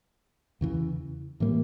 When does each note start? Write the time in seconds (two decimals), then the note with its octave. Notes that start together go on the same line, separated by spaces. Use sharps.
0.61 E2 C#3 E3
1.40 A2 E3 G3 A#3